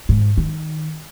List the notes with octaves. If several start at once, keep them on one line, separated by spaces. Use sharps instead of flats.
G#2
D#3